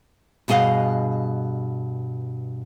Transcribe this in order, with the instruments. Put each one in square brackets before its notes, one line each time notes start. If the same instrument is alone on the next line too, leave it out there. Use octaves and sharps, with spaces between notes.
[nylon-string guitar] G2 B2 G#4 D#5 F5 F#5